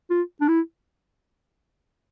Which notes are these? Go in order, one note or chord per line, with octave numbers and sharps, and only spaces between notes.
F4
D4
E4